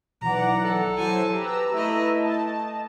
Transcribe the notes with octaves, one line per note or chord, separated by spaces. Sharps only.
B1 E3 D5 F#5 A#5
A4
F#3 E4 C5 G#5 A5
G4 B4 A#5 E6
A3 E4 D#5
A3 D#5 A5